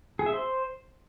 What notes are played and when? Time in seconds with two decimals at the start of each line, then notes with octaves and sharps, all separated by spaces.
0.19 G#4
0.26 E5
0.33 C5